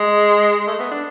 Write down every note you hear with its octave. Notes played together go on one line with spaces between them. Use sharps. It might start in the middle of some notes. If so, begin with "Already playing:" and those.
Already playing: G#3
A3
B3
D4